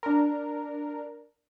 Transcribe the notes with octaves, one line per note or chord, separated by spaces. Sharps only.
D4 A#4